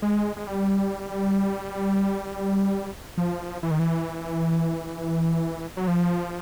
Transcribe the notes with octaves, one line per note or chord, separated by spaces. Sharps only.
G#3
G#3
G3
F3
E3
D#3
E3
F#3
F3